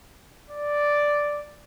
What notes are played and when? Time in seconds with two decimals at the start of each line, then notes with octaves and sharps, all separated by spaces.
0.50 D5